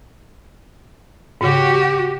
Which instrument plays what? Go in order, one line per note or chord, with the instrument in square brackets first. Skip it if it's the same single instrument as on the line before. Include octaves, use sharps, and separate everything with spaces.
[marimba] G#2 C#3 [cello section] F#4 G4